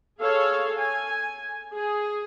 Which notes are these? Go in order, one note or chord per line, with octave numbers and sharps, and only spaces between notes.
G#4 A4 C#5 F5
G#5
G#4